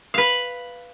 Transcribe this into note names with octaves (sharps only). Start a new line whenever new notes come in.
B4 F5